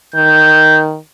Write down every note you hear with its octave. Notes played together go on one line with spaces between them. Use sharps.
D#3 G6